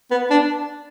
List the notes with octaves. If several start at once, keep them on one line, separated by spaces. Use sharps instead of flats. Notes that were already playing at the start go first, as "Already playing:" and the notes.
B3
D4